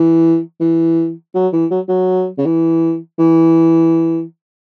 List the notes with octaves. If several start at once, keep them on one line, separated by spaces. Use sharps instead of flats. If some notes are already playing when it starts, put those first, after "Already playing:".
Already playing: E3
E3
F#3
E3
F#3
F#3
C#3
E3
E3